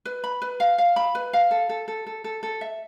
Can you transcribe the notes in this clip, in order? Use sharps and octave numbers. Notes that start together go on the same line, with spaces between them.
B4
B5
B4
F5
F5
B5
B4
F5
A4
A4
A4
A4
A4
A4
E5